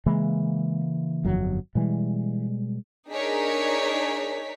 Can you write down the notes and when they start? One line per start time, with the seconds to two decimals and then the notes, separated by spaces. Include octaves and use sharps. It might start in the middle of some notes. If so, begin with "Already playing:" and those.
0.06 C#3 E3 G#3 A#3
1.24 G1 F2 F#3
1.75 B2 E3 G3 G#3
3.10 D4 D#4 G#4 A#4 C#5 B6